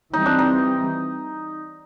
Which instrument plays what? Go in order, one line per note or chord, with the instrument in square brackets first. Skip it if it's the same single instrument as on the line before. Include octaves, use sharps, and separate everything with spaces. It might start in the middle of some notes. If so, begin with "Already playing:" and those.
[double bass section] E3 G3 C4 [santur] D#4
[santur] D4
D#4